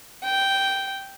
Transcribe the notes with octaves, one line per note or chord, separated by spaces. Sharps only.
G5